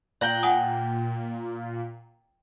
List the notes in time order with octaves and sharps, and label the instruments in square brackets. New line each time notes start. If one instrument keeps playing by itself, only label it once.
[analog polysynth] A#2 [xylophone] D5 [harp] G5 A#5 F#6
[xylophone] F#5 G#5 D#6